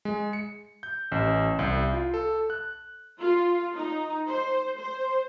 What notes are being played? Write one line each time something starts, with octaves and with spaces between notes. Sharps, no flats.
G#3
C#7
G6
A1
C2
F4
A4
F#6
F4
D#4
C5
C5